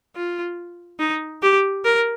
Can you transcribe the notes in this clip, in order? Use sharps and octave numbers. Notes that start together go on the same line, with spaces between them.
F4
D#4
G4
A#4